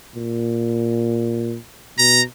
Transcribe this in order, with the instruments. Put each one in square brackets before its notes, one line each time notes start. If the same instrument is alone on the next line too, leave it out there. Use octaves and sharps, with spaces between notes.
[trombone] A#2
[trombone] B2 [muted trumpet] A#5